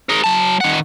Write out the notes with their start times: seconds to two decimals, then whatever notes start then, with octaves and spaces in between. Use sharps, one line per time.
0.09 G#4 A#4
0.24 F#3 A5
0.61 D#3 F#5